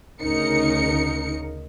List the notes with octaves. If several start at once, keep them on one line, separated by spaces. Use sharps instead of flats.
D2 C#3 D#4 A#4 C#7